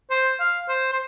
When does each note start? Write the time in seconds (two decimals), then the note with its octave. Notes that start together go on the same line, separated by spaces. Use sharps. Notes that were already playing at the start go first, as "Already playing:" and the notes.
0.11 C5
0.40 F5
0.69 C5
0.93 C5